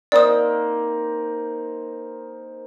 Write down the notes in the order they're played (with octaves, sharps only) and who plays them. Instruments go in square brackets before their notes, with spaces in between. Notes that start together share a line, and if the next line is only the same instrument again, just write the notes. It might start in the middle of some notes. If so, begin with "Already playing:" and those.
[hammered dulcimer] A#3 C4 D#4 [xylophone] D5 D#6